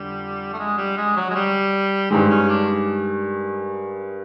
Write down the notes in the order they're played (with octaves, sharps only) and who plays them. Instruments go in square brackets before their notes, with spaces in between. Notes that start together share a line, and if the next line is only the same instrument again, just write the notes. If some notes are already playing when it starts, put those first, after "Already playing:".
Already playing: [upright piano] F2 D3 [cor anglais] G3
[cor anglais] A3
G#3
G3
G#3
F#3
G#3
G3
[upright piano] G2 D#3 G#3 [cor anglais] C4
[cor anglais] C#4
D4